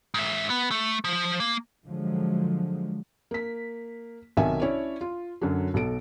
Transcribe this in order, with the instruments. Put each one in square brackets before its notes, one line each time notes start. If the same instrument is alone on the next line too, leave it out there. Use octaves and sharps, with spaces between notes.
[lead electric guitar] G#2 E5
B3
A3
F3
A#3
[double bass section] D3 F3 F#3 G#3
[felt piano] A#3 B6
B1 C3 D#3 A#4 E5 G#5
C#4 D4 E4 C#5 D5
F4
F#2 D3 F#3
B1 B2 A4 D7